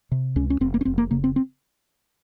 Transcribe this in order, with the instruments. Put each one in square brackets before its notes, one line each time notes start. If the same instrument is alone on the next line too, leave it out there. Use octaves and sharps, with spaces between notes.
[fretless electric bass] C3
C#2 C#4
C#4
F1 C4
A#3
C#4
F1 C4
A#3
C#3 A#3
C4
C4